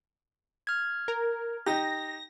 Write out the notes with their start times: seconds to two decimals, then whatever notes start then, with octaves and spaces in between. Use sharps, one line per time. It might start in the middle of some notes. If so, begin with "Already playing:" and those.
0.67 F6 G#6
1.08 A#4
1.66 D#4 G4 A#6